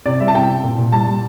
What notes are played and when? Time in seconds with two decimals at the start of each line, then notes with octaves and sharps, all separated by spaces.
0.06 C3 D5
0.20 G3 E5
0.28 A5
0.34 C3 G5
0.49 C3
0.64 A#2
0.78 A#2
0.92 G3 A5
1.07 G3